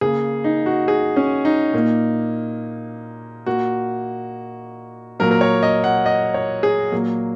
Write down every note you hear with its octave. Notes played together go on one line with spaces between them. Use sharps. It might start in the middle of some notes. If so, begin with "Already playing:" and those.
C#3 A#3 G#4
D#4
F#4
G#4
C#4
D#4
A#2 A#3
A#2 A#3 F#4
A#2 F#3 A#3 A#4
A#4
C#5
D#5
F#5
D#5
C#5
G#4
A#2 F#3 A#3